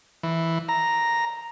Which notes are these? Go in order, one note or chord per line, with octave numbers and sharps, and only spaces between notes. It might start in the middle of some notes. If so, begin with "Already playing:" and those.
E3
A#5